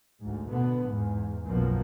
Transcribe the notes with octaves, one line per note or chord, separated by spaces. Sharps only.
D2 G#2
B2 D3 B3
E2 G#2
B1 F#2 B2 F3 A#3